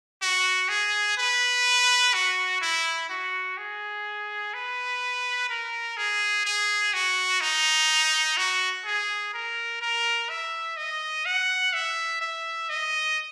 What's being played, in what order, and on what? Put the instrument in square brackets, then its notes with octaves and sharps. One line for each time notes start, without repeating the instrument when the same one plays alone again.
[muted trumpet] F#4
G#4
B4
F#4
E4
F#4
G#4
B4
A#4
G#4
G#4
F#4
D#4
F#4
G#4
A#4
A#4
E5
D#5
F#5
E5
E5
D#5